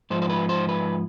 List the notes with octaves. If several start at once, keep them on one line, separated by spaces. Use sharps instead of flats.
G#2 F3 C5
C5
B4
C5
B4